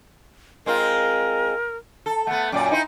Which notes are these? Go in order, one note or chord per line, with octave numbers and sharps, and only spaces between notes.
G#3 C4 F4 A#4
A4
A3 B3 F#5
F#2 A#2 D5 G5
D#4 E4 C5